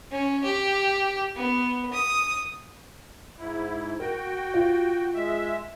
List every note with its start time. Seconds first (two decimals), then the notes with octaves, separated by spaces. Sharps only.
0.11 C#4
0.44 G4
1.36 B3
1.93 D#6
3.39 G#2 E4
4.00 F#4 A#4 G5
4.54 F4
5.15 G#3 E5